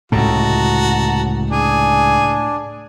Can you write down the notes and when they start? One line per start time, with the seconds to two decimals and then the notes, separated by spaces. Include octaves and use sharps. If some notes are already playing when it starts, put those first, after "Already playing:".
0.12 C#2 A2 C3 F#4 A5 A#5
1.50 D4 G#4